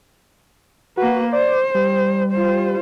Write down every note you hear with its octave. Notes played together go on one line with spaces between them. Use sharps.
A#3 F#4 B4
C5 D5
G3
F4 C5